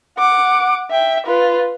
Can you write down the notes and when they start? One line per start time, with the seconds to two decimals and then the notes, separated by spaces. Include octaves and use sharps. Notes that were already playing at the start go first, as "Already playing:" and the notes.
0.18 F#5 D6
0.91 E5 G5
1.26 F4 B4